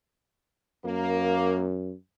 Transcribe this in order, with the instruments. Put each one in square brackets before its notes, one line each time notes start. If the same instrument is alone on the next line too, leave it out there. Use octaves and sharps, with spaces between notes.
[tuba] F#2 [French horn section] A#3